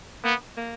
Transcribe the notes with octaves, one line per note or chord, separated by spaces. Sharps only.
A#3 B3
A#3